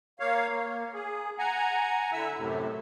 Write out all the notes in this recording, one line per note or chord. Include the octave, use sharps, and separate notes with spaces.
A#3 C#5 F5
A#3
G#4
F#5 G#5 A#5
D3 E4 E5 E6
F#2 A2 C3